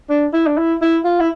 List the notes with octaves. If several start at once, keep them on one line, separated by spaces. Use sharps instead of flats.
D4
E4
D4
E4
E4
F4
E4